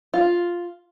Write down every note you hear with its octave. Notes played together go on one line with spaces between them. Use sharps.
F4